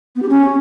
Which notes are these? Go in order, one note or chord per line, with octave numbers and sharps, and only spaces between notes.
B3
G4
C#4